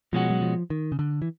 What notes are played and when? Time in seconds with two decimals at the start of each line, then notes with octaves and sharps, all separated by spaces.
0.13 B2 F3 G#3 C#4 F#4
0.30 F#3
0.42 F3
0.70 D#3
0.92 C#3
0.99 D3
1.22 E3